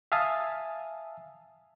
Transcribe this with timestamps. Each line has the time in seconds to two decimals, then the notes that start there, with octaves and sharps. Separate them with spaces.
0.12 E5 F5 G#5 A5 D#6